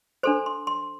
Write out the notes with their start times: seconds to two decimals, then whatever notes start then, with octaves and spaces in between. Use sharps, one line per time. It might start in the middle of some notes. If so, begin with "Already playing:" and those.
0.23 D4 A4 C5 C6
0.46 C6
0.67 C6